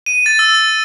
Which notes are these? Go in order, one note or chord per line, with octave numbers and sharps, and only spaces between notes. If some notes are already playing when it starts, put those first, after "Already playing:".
D#7
A6
E6
A6